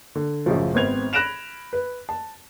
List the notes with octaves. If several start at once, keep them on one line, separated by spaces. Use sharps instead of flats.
D3
A1 F#2 C#3 F3
G#1 B3 C4 G#6 F7
B5 F#6 A#6 D7 E7 F7
B4
A5